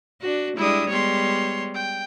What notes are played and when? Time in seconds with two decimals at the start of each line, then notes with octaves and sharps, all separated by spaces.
0.21 D4 F#4
0.57 G3 G#3 D4 E4 D#6
0.88 G3 G#3 B3 C#5 C6
1.74 G5